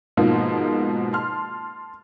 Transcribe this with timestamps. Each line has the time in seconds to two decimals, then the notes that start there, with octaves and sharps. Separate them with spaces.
0.17 G#2 B2 F3 G#3 A#3
1.13 A5 C6 F6